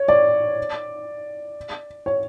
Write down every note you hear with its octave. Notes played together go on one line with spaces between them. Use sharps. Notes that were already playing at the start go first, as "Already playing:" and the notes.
Already playing: C#5
D5
C#5